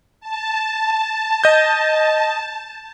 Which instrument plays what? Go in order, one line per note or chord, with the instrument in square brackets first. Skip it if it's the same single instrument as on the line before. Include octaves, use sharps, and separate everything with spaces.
[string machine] A5
[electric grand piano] D#5 G6